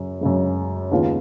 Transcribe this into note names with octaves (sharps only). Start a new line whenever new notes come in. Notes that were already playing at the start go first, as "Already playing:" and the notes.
Already playing: F#2 C#3
F#2 C#3 G#3
D#2 C#3 G#3 B3 F4